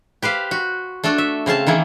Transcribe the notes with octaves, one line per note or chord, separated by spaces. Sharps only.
G4 B4 C5 F5
F#4
A3 D4 F#4 A4
E5
C#3 C4 F5 A5
D#3 E3 A#3 E4